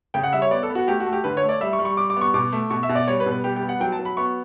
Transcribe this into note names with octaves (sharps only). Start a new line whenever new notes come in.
C#3 G5
F#5
G3 E5
C#5
B3 D5
A4
B3
F#4
A3 G4
F#4
A3
G4
D3 B4
C#5
A3
D5
G3 E5
C#6
G3
C#6
G3 D6
D6
B3 C#6
B2 D6
A3
B2 C#6
E5
B2
D5
G3 C#5
B4
B2
B4
G3 G4
G4
B3
F#5
F#3 G5
A5
F#3
B5
B3 C#6